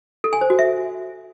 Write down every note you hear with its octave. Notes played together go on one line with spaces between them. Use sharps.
A4
G#5
C5
F#4
E5